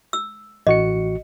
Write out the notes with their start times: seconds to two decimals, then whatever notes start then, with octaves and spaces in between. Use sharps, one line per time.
0.13 E6
0.67 A1 F#4 D#5 C#7